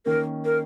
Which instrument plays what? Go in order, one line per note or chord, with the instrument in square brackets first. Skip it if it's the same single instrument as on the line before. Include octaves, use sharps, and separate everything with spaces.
[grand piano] D#3 A#3 C#4 [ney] A#4
[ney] A#4